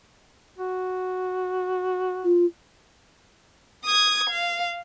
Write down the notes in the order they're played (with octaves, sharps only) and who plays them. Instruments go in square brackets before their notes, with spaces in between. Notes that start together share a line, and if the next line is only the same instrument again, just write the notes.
[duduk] F#4
[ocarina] F4
[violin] D#6 G#6
F5